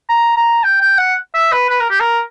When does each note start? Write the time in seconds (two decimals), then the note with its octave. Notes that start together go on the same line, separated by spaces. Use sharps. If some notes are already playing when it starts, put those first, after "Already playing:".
0.09 A#5
0.36 A#5
0.64 G5
0.81 G5
0.98 F#5
1.34 E5
1.52 B4
1.70 B4
1.80 A#4
1.90 G4
2.00 A#4